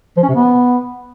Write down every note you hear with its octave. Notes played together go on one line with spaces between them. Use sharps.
F3
C#4
C3
B3